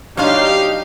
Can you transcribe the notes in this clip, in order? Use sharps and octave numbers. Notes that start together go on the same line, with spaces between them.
F#3 D4 D#4 F4 G4 F5